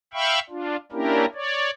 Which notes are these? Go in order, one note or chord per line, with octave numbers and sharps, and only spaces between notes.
E5 F5 G5 B5 C#6
D4 F4
A#3 C#4 D4 E4 G4 A#4
C#5 D5